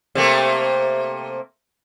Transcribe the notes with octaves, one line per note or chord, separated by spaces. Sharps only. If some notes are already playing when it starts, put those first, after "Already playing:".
C3 A3 A#3